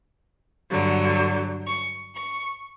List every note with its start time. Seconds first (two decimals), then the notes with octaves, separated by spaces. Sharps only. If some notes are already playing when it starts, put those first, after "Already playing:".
0.71 G2 D3 F#3
1.66 C#6
2.14 C#6